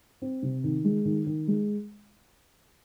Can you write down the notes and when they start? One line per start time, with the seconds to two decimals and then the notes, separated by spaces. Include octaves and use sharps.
0.22 C4
0.42 C3
0.64 D#3
0.85 G#3
1.05 D#3
1.27 D#3
1.48 G#3